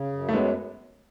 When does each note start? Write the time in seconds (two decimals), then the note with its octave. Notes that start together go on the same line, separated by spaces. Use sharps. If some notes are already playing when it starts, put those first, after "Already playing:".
Already playing: C#3
0.12 F#2
0.29 A3
0.34 F#3 G#3 B3